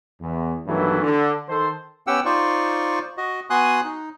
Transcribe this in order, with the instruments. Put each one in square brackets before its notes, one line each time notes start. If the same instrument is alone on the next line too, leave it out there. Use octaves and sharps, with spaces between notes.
[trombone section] E2
B1 G2 D#3 E3 F#3 A3
D3
D#3 A4 C5
[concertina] B3 C#4 G4 F#5 G5 E6
D#4 F4 C5 D5 C#6
F#4 D#5
B3 F#4 G#5 C6 D#6 F#6
D#4